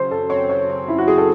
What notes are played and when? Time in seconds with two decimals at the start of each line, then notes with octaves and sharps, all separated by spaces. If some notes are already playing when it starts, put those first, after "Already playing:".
Already playing: C#3 F#3 C5
0.11 F#2 A4
0.30 C4 C#5
0.49 F#3 C#5
0.70 C#3
0.88 F#2 E4
0.98 F#4
1.08 C4 G#4
1.18 A4